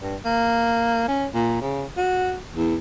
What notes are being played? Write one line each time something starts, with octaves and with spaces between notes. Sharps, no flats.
G2
A#3
C#4
A#2
C#3
F#4
E2